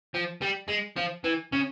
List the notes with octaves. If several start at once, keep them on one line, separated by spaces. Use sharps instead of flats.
F3
G3
G#3
F3
E3
C#3